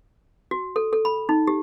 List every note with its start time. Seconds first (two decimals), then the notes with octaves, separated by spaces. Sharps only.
0.51 F#4
0.76 A4
0.93 A4
1.05 B5
1.29 D#4
1.47 G4